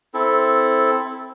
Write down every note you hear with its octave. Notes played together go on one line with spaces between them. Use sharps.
C4 E4 A4